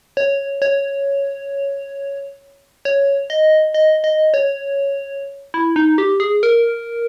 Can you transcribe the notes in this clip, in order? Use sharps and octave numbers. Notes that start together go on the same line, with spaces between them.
C#5
C#5
C#5
D#5
D#5
D#5
C#5
E4
D#4
G4
G#4
A#4